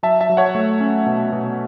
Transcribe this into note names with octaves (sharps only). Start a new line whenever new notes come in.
F#3 E5 A5
E5 A5
F#3
C#5 F#5
A3
C#4
B2
B2